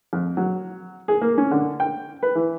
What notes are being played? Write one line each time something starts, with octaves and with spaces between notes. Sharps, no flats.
F2
F#3
G#4
A#3
C#4
D3
G5
B4
E3